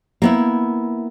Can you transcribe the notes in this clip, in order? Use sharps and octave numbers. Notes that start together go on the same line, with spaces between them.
A#3 B3 E4